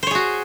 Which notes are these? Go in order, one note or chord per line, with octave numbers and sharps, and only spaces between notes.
F#4 G#4 C5 C#5